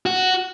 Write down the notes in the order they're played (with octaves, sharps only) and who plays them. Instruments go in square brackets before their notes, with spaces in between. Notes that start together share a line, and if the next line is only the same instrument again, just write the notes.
[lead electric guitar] F#4